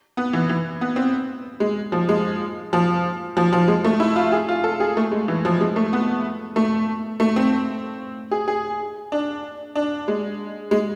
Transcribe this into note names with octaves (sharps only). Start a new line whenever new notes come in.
B3
E3
E3
B3
C4
G#3
F3
G#3
F3
F3
F3
G#3
A3
E4
F4
G#4
F4
A4
G#4
A3
G#3
E3
F3
G#3
A3
B3
A3
A3
C4
G#4
G#4
D4
D4
G#3
G#3